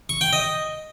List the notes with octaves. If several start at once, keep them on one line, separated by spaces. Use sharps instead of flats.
C#6
G5
D#5